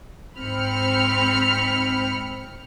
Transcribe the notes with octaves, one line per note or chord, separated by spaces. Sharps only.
G#2 C4 B5 F6 C#7